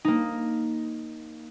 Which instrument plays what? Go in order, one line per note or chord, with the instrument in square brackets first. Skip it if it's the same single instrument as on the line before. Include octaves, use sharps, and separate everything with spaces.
[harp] A#3 D#4